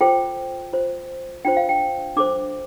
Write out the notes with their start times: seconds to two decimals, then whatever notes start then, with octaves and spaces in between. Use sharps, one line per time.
0.01 F4 A4 C5 G5
0.73 F4 C5
1.45 D4 F4 C5 G5
1.57 F5
1.69 G5
2.17 D4 A4 C5 D6